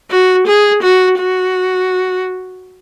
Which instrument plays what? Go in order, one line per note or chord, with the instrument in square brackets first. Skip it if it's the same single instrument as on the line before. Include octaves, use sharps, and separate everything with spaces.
[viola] F#4
G#4
F#4
F#4